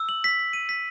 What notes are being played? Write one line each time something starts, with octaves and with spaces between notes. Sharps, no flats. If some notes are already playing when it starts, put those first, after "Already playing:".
Already playing: E6
F#7
B6
B6
D#7
B6